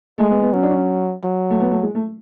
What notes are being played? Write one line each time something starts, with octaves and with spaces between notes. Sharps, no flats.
G#3 A3
B3
B3
F#3 C#4
D4
C#4
F#3
A3
B3
A3
G#3
A3